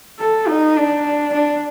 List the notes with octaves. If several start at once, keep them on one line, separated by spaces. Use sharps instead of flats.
A4
D#4
D4
D4